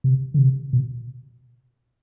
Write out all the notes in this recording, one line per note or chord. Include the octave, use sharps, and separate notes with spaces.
C3
D3
C3
B2